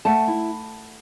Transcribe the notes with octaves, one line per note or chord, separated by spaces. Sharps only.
A3 F#5 A5
E4